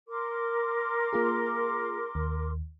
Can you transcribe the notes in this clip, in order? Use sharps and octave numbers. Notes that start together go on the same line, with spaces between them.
A#4 C6 D6
A#3 F4 G#4
D#2